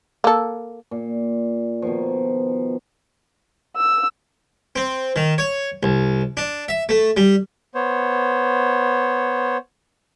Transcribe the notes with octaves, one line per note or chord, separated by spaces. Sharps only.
A#3 A4
A#2
B2 D#3 F3
E6
C4
D#3
C#5
C2
D4
E5
A3
G3
B3 C5 C#5